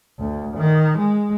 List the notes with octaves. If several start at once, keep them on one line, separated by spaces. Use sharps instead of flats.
D2
D#3
G#3